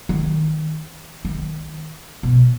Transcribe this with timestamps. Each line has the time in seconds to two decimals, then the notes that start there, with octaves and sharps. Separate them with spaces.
0.09 D#3
1.25 D#3
2.23 B2